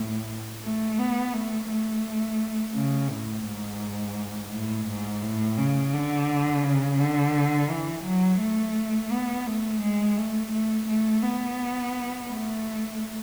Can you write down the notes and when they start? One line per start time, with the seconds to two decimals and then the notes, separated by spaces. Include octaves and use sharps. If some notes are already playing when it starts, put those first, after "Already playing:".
Already playing: A2
0.63 A3
0.99 B3
1.33 A3
1.70 A3
2.75 C#3
3.10 A2
3.46 G#2
4.52 A2
4.88 G#2
5.23 A2
5.58 C#3
5.93 D3
6.64 C#3
7.00 D3
7.70 E3
8.05 F#3
8.40 A3
9.11 B3
9.46 A3
9.82 G#3
10.17 A3
10.52 A3
10.88 A3
11.23 B3
12.29 A3